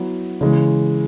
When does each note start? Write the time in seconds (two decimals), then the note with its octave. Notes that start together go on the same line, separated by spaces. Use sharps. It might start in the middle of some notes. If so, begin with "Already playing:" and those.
Already playing: F#3 B3 E4
0.41 C#3 E3 G#3